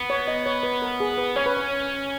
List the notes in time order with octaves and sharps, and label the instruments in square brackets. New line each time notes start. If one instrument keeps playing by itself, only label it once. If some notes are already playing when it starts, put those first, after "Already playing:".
Already playing: [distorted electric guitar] B3
[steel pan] C#5
D#5
C#5
B4
A#4
G#4
B4
[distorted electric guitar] C#4 [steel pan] C#5
[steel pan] B4
C#5